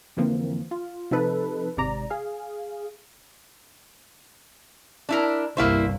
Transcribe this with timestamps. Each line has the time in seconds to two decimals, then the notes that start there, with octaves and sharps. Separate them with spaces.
0.17 F2 D3 E3 F3 A#3 C4
0.71 F4
1.11 C3 F3 D#4 A4 B4
1.77 G#1 G#2 C3 D5 A#5
2.10 G#4 F5
5.09 D4 E4 A#4
5.57 G1 C2 A#3 E4 C5